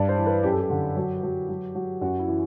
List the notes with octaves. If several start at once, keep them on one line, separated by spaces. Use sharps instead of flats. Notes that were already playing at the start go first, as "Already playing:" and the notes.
Already playing: G2 D5
C5
E3
B4
F#2 G4
A4
G4
D3
F#3
F#3
F#3
F#3
F#2 F#4
E4
E3